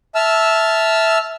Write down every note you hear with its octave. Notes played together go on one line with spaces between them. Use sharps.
E5 A5 E6 F6